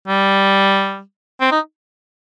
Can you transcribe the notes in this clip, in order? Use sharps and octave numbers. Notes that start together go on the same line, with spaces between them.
G3
C4
D#4